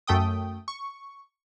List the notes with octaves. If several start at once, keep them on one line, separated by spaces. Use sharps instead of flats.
F#2 A3 G5 D#6
C#6